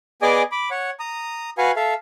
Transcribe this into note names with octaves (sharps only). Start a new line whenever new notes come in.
B3 G#4 D5 D#5 G#5 D6
B5 D6
C#5 F#5
A#5 D#6
F#4 B4 F5 F#5 G#5
A4 E5 F5